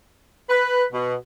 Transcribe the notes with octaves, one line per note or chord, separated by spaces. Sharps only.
B4
B2